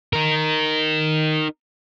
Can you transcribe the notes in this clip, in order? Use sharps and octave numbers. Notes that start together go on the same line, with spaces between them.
D#4 A#4